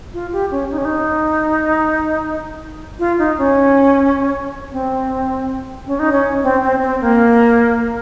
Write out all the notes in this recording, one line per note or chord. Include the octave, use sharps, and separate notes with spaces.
F4
G4
C#4
D#4
C#4
D#4
F4
D#4
C#4
C4
C#4
D#4
C#4
C4
C4
C4
A#3